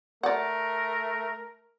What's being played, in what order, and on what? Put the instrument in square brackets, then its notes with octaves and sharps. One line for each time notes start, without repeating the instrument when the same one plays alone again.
[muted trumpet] A3 [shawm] A#4 [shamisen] D5 F#5